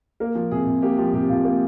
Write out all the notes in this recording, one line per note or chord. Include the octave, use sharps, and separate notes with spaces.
A#3 A#4
F3
C3 G#4
C3
A#3 G4
F3 G4
C3 G4
C3 F4
A#3